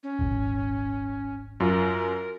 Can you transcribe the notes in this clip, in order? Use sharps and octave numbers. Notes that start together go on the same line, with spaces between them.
C#4
D#1 G#1
F#2 F4 A#4